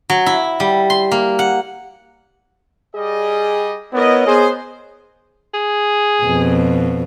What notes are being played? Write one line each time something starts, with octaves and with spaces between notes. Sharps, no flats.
F#3
E4
G3
C6
A#3
F#5
G3 G#4 D#5
B3 E4 A#4 C#5 D#5
B3 G#4 C5
G#4
F2 B2